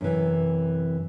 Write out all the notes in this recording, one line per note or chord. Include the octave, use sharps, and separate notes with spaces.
F#2 C3 E3